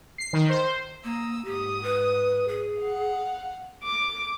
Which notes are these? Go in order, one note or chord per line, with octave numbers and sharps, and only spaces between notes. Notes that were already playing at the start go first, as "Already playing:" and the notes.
C7
D#3
C5
A#3 A#5 D#6 E6
G#2 G4 D#6
B4
G#4
F5 F#5
D6